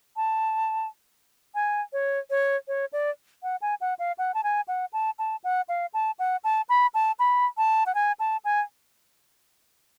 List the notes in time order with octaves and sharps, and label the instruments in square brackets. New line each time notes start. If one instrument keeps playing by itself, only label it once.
[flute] A5
G#5
C#5
C#5
C#5
D5
F#5
G#5
F#5
F5
F#5
A5
G#5
F#5
A5
A5
F#5
F5
A5
F#5
A5
B5
A5
B5
A5
F#5
G#5
A5
G#5